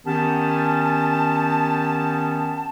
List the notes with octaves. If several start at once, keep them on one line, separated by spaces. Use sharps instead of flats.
D#3 B3 C#4 G4 A5